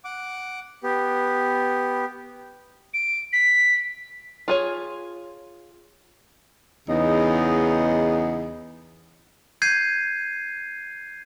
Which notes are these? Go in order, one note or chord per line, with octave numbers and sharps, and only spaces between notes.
F#5 D6
B3 G4
D7
B6
F4 G#4 C#5
E2 C#3 B3 D#4
G6 G#6 C7 D#7